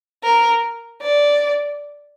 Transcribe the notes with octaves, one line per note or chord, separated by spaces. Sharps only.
A#4
D5